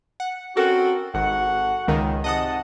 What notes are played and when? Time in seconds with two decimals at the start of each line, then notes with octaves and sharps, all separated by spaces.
0.20 F#5
0.57 C4 C#4 F#4 A4 A#4
1.14 G#1 F#4 A4 F#5
1.88 C#2 D#3
2.24 G#2 C3 D#5 F#5 A5 D#6